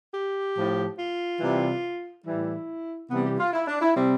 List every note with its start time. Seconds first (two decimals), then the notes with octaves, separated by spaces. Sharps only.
0.12 G4
0.54 A2 F3
0.98 F4
1.40 C3 E3 G3
2.25 A2 E3 G3 E4
3.10 C3 E3 G3 B3
3.24 G4
3.38 F4
3.53 E4
3.67 D4
3.81 E4
3.95 C3 G3 C4